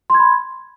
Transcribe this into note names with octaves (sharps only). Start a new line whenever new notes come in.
B5 C6 G#6